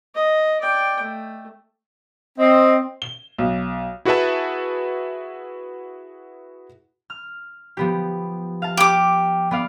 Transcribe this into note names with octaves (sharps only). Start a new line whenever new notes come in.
D#5
D5 G5
A3
C4 D#5
G7
B1
E4 F#4 G#4 B4 E5 A5
F6
F3 B3 G4
F5 A5
G4 D6
B3 D5 F5